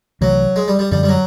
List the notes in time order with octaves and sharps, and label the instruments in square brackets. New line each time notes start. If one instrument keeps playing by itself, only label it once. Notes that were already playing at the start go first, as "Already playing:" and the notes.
[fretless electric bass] C2 C3 E3 A3 [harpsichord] F#3
[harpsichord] G#3
G3
G3
[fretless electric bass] F#2 D3 F3 [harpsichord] G3
[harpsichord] G3
F#3